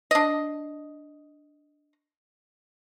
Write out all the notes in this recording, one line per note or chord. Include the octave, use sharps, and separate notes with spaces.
D4 D#5